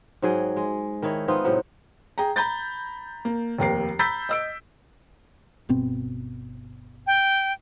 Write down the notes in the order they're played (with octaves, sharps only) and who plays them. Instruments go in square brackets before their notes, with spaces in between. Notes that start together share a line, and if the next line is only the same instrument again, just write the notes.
[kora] G#2 F#3 G#4 G5
G#3
D#3 D#4 E4 C#5
B3 C4 D#4 F4
A2 C3 F#3
[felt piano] G#4 G5 A#5
A#5 B5 G6 A6
A#3
F1 D#2 A#4 C7
A#5 B5 E6 G6 A6 B6
D#5 E6 D7
[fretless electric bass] G1 B2 C4
[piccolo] G5